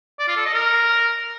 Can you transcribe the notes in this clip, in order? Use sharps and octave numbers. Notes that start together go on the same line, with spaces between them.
D5
F4
A4
D#5
A#4